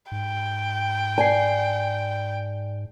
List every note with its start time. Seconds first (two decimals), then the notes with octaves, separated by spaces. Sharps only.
0.12 G#2 G5
1.18 D5 G#5 A5 C7